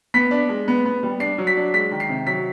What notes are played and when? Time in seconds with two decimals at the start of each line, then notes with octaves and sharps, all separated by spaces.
0.14 B3 B6
0.31 D4
0.49 G#3
0.68 B3
0.85 B3
1.03 G3
1.20 D4 C7
1.38 F#3
1.47 B6
1.57 D4
1.74 G#3 B6
1.91 D#3
2.00 C7
2.09 C3
2.27 F#3 B6